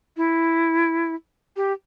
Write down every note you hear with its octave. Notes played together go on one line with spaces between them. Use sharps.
E4
G4